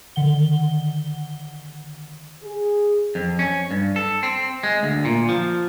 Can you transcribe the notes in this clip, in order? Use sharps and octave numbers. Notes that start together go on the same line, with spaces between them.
D3 D#3 F#5 G7
G#4
F2
C#4
G2
A4
C4
G#3
D2
A#2
F3